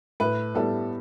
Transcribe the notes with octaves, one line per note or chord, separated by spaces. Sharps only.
A2 B4
G3 B3 E4 A4